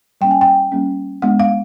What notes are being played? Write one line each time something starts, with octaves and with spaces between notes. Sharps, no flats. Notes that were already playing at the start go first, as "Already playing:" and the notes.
G3 A#3 C#4 G5
G#5
G5
G3 A#3 C#4
G#3 B3 D4 F#5
F5